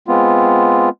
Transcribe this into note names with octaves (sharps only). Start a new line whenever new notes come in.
G#3 B3 C4 F4